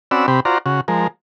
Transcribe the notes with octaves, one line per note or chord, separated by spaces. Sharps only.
C4 C#4 F#4 D5 B5 E6
C3 C4 G4 B5
F4 F#4 C5 D5 A#5
C#3 F#4
F3 G#3 A#4